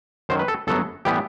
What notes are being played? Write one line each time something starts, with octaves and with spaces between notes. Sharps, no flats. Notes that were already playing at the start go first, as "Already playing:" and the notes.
F#2 D#3 F#3 C5
B4
A4
G1 F#2 F#3 B3 A4
A2 E3 G3 B3 G4